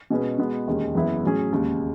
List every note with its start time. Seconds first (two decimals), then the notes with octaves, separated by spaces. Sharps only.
0.10 B2 G#3 C#4 G#4 B4
0.38 B2 G#3 B3
0.67 E1 D#2 D#3 G#3 C#4
0.95 F#1 F#2 E3 B3 E4
1.23 A2 F#3 C#4 G#4
1.51 E1 D#2 C#3 G#3